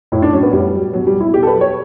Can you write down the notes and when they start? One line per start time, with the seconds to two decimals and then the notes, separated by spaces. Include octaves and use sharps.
0.12 A2 E4
0.22 D4
0.33 F#3 C#4
0.43 B3
0.53 A2 G3
0.74 F#3
0.93 B2 F#3
1.07 G3
1.13 F#3
1.20 E4
1.34 B2 G4
1.43 A4
1.47 B4
1.54 F#3
1.61 C#5